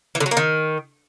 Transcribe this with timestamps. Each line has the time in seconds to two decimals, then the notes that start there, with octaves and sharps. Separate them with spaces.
0.15 E3
0.20 D3
0.26 F#3
0.31 A#3
0.37 D#3